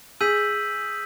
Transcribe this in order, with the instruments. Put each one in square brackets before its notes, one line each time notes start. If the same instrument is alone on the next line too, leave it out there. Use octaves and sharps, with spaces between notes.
[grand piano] G#4 [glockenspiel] E6 G6 B6 D#7 F#7